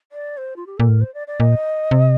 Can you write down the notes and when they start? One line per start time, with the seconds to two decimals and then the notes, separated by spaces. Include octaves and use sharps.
0.12 D5
0.37 C5
0.56 F4
0.67 G4
0.78 A#2 A4
0.88 A2 A#4
1.01 C5
1.14 D5
1.27 D5
1.40 A#2 D#5
1.91 C3